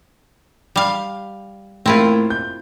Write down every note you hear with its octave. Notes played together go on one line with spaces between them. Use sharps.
G3 F5
A2 A#3 C4 E4 F4 A#4
G6